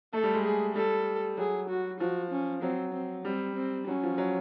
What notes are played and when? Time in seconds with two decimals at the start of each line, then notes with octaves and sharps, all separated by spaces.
0.13 A3 A4
0.23 G3
0.34 G#3
0.44 G#4
0.75 G3 A4
1.38 F#3 G#4
1.69 F#4
2.00 F3 F#4
2.31 C#4
2.62 F#3 C4
2.94 C4
3.25 G3 C4
3.56 C4
3.87 F#3 C#4
4.03 F3
4.18 F#3